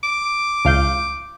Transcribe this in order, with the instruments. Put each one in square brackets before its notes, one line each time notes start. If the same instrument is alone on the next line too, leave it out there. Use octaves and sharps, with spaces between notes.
[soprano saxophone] D6
[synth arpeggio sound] C#2 F5 G6